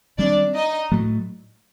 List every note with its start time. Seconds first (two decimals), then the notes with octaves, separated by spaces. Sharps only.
0.18 D#3 G3 C4 D4 D5
0.54 D#4 D#5
0.92 A2 F#3 A3